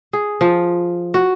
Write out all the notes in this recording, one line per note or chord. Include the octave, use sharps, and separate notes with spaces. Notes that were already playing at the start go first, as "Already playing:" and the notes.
G#4
F3
F#4